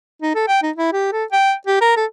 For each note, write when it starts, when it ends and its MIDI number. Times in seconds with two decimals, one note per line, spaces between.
0.22 0.34 63
0.35 0.48 69
0.48 0.59 79
0.63 0.71 63
0.76 0.92 64
0.93 1.11 67
1.12 1.24 69
1.32 1.53 79
1.67 1.79 67
1.81 1.95 70
1.97 2.05 69